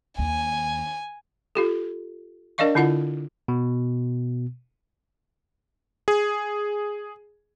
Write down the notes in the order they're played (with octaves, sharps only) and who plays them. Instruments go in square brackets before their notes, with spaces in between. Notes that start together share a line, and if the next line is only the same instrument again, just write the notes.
[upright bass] D#2 [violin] G#5
[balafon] F4 G4 A4
D4 A#4 D5 D#5 F5 C#6
D3 E4 F4 F#5
[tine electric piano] B2
[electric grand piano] G#4